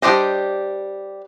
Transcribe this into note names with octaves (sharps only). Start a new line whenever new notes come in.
G3 D4 G4 C5 D#5